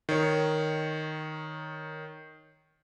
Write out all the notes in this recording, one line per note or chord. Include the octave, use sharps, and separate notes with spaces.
D#3 C#5